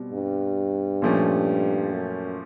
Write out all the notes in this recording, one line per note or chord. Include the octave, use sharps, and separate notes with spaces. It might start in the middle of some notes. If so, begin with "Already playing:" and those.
Already playing: B2 G3 C4
G2
A#2 F3 A3 C#4
F#2